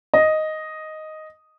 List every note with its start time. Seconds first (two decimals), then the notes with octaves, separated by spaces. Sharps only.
0.14 D#5